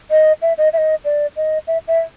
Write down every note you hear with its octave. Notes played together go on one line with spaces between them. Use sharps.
D#5
E5
D#5
E5
D#5
D5
D#5
E5
E5